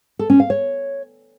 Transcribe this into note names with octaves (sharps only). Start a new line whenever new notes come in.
A4
C#4
F5
C#5